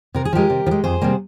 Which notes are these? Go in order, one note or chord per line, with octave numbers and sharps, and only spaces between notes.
C3 A#4
G#4
F3 G#3 G4 A#4
C3
F3
G#3
F2 G#4 C5
C3 G3 A#3